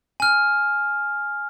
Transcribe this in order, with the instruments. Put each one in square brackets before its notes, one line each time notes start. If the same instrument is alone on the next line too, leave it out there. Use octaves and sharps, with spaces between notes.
[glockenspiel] G#5 F6